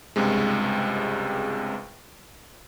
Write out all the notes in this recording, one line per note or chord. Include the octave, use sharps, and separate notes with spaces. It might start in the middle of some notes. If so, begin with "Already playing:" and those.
C#2 G2 C3 G#3